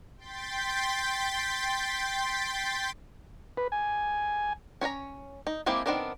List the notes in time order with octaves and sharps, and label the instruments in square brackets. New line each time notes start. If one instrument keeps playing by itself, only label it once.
[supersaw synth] G5 C6 G6 A6 B6
[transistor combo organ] B4
G#5
[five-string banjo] C#4 C#5 F5 A#5
D#4
G#3 A#3 C4 E4 G4
D#3 B3 C4 D4 A#4